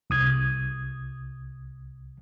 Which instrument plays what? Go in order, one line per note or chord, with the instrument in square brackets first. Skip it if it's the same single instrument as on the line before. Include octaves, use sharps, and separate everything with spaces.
[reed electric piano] C2 D#6 G#6